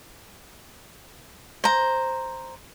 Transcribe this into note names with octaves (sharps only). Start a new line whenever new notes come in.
C5 A#5